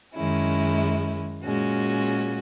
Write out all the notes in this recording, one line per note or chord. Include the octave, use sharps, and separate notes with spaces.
F#2 D#3 G#3 C#4 E4
A#2 G#3 C#4 F#4